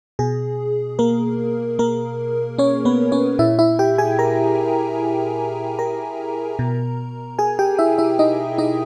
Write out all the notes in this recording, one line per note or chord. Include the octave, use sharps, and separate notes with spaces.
B2 G#4
A#3 A#4
A#3 A#4
C#4 C#5
B3 B4
C#4 C#5
A#2 E4 E5
E4 E5
G4 G5
G#4 G#5
A#4 A#5
A#4 A#5
B2
G#4 G#5
G4 G5
E4 E5
E4 E5
D#4 D#5
D#4 D#5